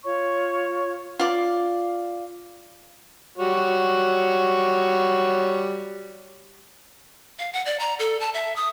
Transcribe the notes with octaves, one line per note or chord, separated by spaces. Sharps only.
F4 C#5 C#6
F4 D5
G3 F#4 C#5
F5
F#5
D5
A#5
A4
A5
E5
D#6